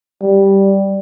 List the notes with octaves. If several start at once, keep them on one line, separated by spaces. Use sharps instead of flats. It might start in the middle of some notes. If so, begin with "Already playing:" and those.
G3